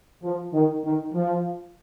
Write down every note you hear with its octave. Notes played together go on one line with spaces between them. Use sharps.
F3
D#3
D#3
F3